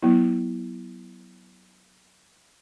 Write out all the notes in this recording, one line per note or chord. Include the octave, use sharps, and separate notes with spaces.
F#3 B3 E4